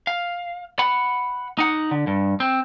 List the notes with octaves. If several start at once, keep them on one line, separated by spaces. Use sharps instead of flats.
F5
F#5 B5
D#4 F#5
D3
G2
C4